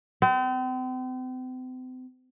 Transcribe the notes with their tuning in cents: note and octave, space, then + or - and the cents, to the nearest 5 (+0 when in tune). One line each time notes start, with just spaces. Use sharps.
C4 -40